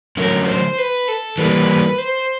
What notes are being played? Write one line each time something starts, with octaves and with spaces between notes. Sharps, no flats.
D3 F#3 A3 C#4 A#4
C5
B4
A4
E3 G3 A#3 B4
C5